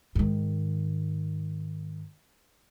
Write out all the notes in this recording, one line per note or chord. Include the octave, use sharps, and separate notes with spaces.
G#2 D#3